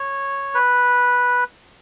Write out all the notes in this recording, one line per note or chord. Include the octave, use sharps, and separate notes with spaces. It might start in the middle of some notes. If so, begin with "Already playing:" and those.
Already playing: C#5
B4